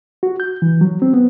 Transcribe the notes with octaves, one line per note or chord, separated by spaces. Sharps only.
F#4
G6
E3
F#3
C4
B3